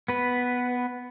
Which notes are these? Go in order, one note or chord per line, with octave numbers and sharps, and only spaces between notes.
B3 B4